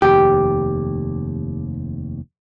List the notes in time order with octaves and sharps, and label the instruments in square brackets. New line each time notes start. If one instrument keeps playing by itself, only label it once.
[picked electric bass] F1 D#2 [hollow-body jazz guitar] G4